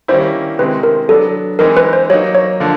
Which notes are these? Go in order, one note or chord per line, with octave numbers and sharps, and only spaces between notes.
D#3 G3 A#3 C#4 E4 C5
C3 D#3 G#3 C4 E4 B4
A#4
F#3 B3 D4 A4
E3 G#3 C4 D#4 A#4
B4
C5
F#3 A#3 D#4 C#5
C#5
D3 F3 A#3